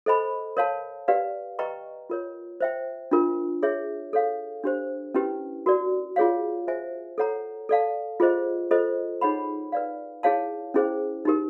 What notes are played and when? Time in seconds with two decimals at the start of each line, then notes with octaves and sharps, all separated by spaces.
0.06 A4 C5 D#5 G#5 B5
0.57 A#4 C#5 F5 A5
1.08 G4 B4 D5 F5
1.59 B4 D#5 G5 A#5 C#6
2.10 F4 A#4 C#5
2.60 C5 E5 G5
3.11 D4 F4 A#4
3.63 G#4 C#5 E5
4.13 A4 C#5 F5
4.64 D4 G4 C5
5.14 C#4 E4 G4 B4
5.66 F#4 A#4 D5
6.16 F4 G#4 C#5 F5
6.68 C5 E5 G#5
7.18 A4 C#5 F#5 A#5
7.69 A4 D5 F5 A5
8.20 F4 G#4 C5 D#5
8.71 F4 A4 C5 D#5
9.21 D#4 G#4 C#5 F#5 B5
9.72 B4 D5 F5
10.23 E4 G#4 C#5 F5 A5
10.74 C#4 E4 G#4 C5
11.25 D#4 G4 A#4